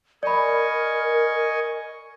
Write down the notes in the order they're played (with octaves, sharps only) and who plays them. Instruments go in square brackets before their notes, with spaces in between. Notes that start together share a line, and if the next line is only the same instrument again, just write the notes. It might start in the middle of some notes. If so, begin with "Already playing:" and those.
[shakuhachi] A#4 [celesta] D5 B5 [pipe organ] D#5 G#5 C#6